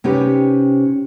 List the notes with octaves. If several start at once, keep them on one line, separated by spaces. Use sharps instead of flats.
C3 C#4 D#4 G4 B4